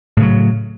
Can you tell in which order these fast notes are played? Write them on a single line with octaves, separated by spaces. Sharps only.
A2 C#3 F#3